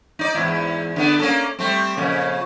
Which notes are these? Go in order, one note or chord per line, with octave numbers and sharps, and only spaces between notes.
D#4 D5
E2 G#2 E4
D3 B3 D4
A#3 C#4 A4
G3 A3 C4
F2 A#2 C#3